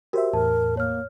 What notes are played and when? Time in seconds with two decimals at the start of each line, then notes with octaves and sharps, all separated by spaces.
0.13 F#4 G4 A#4 C5 E5
0.33 E2 A2 A#4 A5
0.77 A#3 C#5 F6